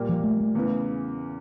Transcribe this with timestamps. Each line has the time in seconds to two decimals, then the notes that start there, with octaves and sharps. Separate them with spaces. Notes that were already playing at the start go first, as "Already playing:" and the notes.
Already playing: A#2 G3 A#3
0.09 F3
0.24 A3
0.40 A3
0.55 E2 C#3 E3